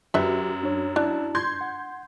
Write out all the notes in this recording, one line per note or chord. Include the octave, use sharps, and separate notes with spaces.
F#2 F#4 G4 B4 E5
D4 C#5
D4 E4 A5
C6 G6 G#6
F#5